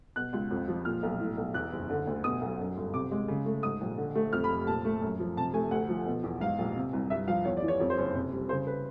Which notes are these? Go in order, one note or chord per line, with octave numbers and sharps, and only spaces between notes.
B2 F#6
C#2
F2
F3
A#2 F6
B1
A2
B1
E2 F#6
F#1
D3
D2
B2 D#6
B1
F#2
G1
C3 D6
G#3
C#3
A3
G#2 D#6
A#1
D3
A3
F2 F6
B5
F1
A#2 A5
A3
F#2
F3
C3 A5
A3 G#5
D2 F#5
F3
B2
E2
G#2 F5
A#1
C3
C2
G2 E5
F3 F5
E2 C#5
D5
E3
C#5
F2 C#5
C5
F#1 C#5
C3
G3
C#3 C5
B4